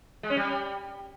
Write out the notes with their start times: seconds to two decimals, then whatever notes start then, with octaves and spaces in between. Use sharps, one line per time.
0.23 G#3
0.30 C#4
0.37 G3